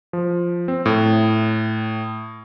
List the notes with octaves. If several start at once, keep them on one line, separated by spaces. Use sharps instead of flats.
F3
C4
A2